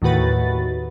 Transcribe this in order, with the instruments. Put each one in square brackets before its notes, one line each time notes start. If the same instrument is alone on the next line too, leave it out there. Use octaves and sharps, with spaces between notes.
[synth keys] D#2 A2 D#3 F#4 B4 A6